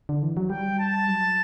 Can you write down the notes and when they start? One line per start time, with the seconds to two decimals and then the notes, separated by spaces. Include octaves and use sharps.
0.09 D3
0.23 E3
0.37 F#3
0.50 G3 G5
0.79 A5
1.07 F#3